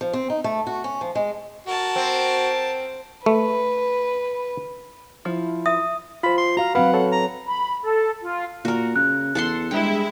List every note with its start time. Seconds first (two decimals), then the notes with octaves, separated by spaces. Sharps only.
0.01 F3
0.13 C4
0.30 D#4
0.44 A3
0.67 F#4
0.84 C#4
1.01 F3
1.15 G#3
1.67 F#4 A#4 A5
1.96 C4
3.26 A3 B4
5.25 F3 E4
5.66 E5 D#6
6.23 F4 C5 B5
6.38 C6
6.57 F#4 F5 A#5
6.75 F#3 C4 B4 F5 F#5 B5
6.93 A4 C#5
7.12 A#5
7.47 B5
7.84 A4
8.22 F4
8.65 A#2 F#4 A#4
8.96 C#3 F#6
9.35 E2 A4 F#5 C6
9.71 G2 G#3 E4 G5